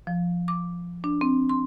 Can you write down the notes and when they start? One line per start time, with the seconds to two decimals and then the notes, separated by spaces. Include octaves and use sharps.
0.07 F3
0.48 D6
1.04 D4
1.21 C4
1.49 C6